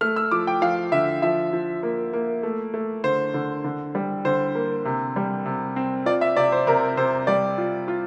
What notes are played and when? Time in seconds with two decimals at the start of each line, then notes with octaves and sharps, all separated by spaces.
0.01 A3 F6
0.16 E6
0.31 F3 D6
0.47 G5
0.62 F3 F5
0.92 D3 E5
1.22 F3 E5
1.53 F3
1.83 A#3
2.13 A#3
2.43 A3
2.74 A3
3.04 D3 C5
3.34 D3
3.64 D3
3.95 G3
4.25 D3 C5
4.55 A#3
4.85 C3
5.16 G3
5.46 C3
5.76 C4
6.06 F4 D5
6.21 E5
6.37 C3 D5
6.52 C5
6.67 C3 A#4
6.97 C3 C5
7.27 G3 D5
7.58 F4
7.88 F4